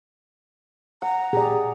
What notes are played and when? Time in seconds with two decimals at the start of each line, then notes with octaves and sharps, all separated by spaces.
1.02 F#5 A#5
1.33 A#2 G4 G#4 D5